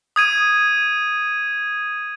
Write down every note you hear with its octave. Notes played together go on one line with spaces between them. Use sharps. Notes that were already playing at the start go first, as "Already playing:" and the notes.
D#6 G#6 D#7